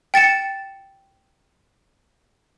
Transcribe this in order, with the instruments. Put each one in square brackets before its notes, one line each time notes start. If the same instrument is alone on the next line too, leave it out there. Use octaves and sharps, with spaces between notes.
[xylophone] G5 A6 C#7 E7